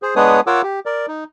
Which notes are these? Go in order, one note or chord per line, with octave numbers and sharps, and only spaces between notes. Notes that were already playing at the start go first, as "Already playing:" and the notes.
G#4 C5
G#3 B3 D4 B4 C#5 D#6
F4 A#4 C#5 F#5 D6 E6
G4
A#4 D5
D#4